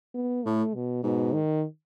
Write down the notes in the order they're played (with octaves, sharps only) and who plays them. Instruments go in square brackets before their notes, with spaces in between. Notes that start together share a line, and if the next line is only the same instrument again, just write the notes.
[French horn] B3
[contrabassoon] A2 [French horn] A3
[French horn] B2
[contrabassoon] G#2 [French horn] B2
[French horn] D#3